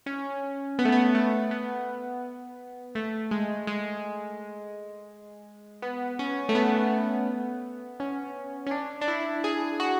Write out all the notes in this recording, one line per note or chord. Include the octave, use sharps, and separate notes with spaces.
C#4
B3
A3
B3
A3
B3
A3
G#3
G#3
B3
C#4
A3
B3
C#4
C#4
D4
D4
E4
G#4
F#4